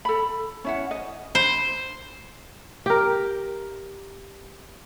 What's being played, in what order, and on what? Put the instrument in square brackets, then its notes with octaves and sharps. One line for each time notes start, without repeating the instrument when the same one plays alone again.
[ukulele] A4 B5
C#4 E4 F#5
D#5
[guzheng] C5 [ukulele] B5
[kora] G4 A#4